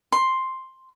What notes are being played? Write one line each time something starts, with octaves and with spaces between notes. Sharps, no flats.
C6